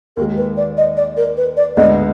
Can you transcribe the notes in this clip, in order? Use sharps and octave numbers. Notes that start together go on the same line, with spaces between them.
D#2 D#3 G#3 A#4
B4
D5
D#5
D5
A#4
B4
D5
D2 D3 G#3 B3 D#5